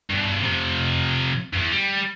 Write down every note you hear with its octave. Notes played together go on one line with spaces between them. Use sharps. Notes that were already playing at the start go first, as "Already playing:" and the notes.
G2 B2
C3 F3
E2 G2
G3